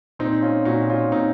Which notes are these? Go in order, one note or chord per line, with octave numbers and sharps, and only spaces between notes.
A#2 C4 D#4
C#4 F4
A#2 D#4 F#4
C#4 F4
A#2 C4 D#4